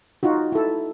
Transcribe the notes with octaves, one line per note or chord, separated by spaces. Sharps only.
D#4 F4 F#4
E4 A4